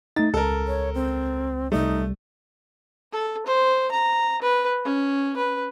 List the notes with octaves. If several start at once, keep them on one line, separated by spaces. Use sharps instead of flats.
A3 D#4 A6
C#2 A4 A#4
C#5
C4
C2 G3 A3 D#4
A4
C5
A#5
B4
C#4
B4